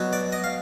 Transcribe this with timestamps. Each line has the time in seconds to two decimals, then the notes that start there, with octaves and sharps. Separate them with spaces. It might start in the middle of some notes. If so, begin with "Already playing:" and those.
Already playing: B2 F#3 B3
0.13 D5
0.32 D#5
0.44 F5